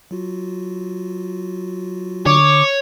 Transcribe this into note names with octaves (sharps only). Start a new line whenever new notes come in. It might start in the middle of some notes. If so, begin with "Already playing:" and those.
F#3 F4 F#4
D3 C#5 D6